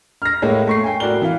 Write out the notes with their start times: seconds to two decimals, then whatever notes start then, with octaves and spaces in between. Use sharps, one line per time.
0.22 F6 A#6
0.42 A2 G#3 A#3 C#5
0.67 A3 C#6 C7
0.84 G5 G#5
1.00 A2 F#4 A#4 D5 G7
1.22 E3 F5